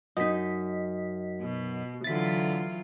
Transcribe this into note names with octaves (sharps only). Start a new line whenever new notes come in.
F#2 D#4 D#5 B6
B2
D3 E3 F#3 F4 A6 B6